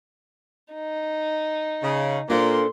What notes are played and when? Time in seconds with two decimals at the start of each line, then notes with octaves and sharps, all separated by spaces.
0.73 D#4
1.83 C#3
2.30 A#2 A#3 D4 A4 C5 C6